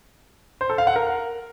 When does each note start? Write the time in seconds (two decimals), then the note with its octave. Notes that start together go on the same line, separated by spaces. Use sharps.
0.61 C5
0.70 A4
0.78 F5
0.87 F#5
0.96 A#4